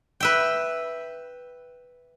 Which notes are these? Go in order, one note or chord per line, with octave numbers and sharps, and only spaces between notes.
B4 E5 G5